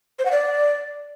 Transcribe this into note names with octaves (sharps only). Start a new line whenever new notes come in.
C5
F#5
D5